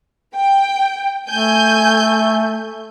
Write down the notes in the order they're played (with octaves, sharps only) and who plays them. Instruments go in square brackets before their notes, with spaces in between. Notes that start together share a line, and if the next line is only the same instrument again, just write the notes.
[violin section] G5
[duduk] A3 [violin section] G#5 G6